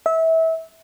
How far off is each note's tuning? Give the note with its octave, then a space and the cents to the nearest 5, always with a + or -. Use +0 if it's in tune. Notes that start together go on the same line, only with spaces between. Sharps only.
E5 -25